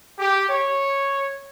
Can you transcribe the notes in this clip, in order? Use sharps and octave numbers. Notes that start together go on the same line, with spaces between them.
G4
C#5